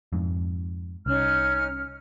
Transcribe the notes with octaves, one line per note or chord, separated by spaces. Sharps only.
F2 G#2
C2 C#4 D#4 F6